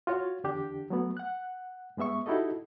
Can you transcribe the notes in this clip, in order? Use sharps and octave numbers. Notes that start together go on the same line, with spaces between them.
F4 F#4 C#5
E2 D3 D4 G4
F#3 A3 B3
F#5 F#6
G2 G#3 B3 E5 C#6
D#4 E4 F#4 G4 A4 D#5